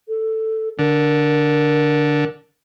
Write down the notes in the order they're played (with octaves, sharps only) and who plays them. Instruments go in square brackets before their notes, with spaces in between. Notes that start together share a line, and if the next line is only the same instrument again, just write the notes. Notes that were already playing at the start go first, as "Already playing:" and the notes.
[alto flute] A4
[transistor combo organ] D3 [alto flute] A#4